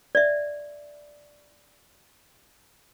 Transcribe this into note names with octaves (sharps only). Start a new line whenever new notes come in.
D5 E5